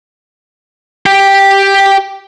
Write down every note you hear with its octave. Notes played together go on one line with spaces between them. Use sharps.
G4 G5